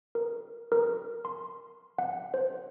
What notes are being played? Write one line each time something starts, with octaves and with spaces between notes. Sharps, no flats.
A#4
A#4
C6
F#5
C5